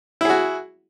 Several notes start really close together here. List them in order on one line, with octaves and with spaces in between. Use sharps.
E4 G#4 F#4